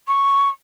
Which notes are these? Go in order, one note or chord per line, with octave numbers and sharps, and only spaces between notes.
C#6